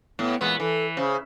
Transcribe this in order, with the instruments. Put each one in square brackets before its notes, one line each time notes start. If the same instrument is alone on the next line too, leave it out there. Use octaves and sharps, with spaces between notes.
[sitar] A2 [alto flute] B3
[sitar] A#2 E3 B3 [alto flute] G#3
[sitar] E3 [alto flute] A4
[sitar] C#3 [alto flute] C5